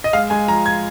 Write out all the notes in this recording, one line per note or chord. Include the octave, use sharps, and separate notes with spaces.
D#5
G#3 F5
G#3 G#5
F3 A#5
G#6